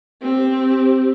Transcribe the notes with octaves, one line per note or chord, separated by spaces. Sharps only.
C4 G4